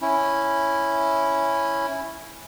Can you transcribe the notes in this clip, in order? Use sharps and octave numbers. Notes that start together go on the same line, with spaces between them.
C#4 E4